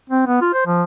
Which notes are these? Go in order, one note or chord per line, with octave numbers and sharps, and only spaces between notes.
C4
B3
F4
C5
F3